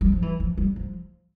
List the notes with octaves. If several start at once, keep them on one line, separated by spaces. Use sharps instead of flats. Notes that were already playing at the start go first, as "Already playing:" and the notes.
G3
F3
E3
F3
G3
F3